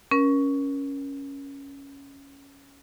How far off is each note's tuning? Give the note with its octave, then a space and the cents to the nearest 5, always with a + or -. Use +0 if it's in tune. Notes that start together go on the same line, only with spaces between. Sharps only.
C#4 +0 A#4 +30